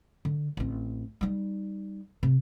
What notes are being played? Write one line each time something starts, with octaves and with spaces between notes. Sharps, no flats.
D3
A1 C4
G3 D#4
C3